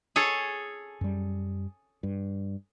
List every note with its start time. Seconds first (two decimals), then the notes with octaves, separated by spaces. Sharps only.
0.16 G#4 A4 C#5
1.01 F#2 G3
2.03 G2